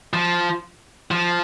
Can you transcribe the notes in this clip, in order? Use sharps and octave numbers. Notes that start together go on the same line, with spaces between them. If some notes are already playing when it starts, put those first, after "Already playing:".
F3
F3